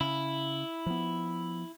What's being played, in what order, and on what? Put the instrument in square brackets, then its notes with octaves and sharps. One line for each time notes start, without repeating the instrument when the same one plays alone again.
[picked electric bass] C#3 [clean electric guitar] E4
[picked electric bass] F3 B3